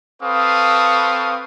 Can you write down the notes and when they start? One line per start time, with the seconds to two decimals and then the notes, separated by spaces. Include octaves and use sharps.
0.23 C4 A4 B4 F5 C#6 D#6